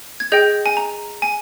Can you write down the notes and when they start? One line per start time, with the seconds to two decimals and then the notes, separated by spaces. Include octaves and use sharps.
0.20 G#6
0.32 G#4 D#5 G5 G6
0.66 G#5
0.77 A#5
1.22 G#5